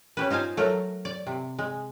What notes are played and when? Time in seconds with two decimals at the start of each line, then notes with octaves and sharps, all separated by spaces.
0.17 C#4 G4 B4
0.30 D#4 F4 C5 F5 G#5
0.57 F#3 A3 A#4 A#5
1.05 D5
1.27 C3
1.59 G#3